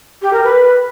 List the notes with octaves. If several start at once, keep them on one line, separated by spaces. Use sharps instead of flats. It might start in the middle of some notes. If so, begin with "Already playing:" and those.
G4
A#4
B4